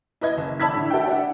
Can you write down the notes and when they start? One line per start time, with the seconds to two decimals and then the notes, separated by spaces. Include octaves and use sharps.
0.21 E4 B4 D#5 G#6
0.37 F#1
0.60 D5 A5 B5 E6 G#6 B6
0.74 A2 D3
0.90 F#4 A4 E5 F#5 G5
1.08 D4 E5 F#5